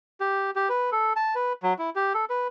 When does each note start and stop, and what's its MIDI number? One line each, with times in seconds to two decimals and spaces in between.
0.20 0.51 67
0.56 0.69 67
0.69 0.90 71
0.92 1.13 69
1.16 1.35 81
1.35 1.53 71
1.63 1.73 54
1.79 1.90 64
1.96 2.13 67
2.14 2.25 69
2.30 2.48 71